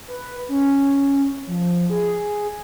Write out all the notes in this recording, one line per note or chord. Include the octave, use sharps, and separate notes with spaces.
B4
C#4
F3
G#4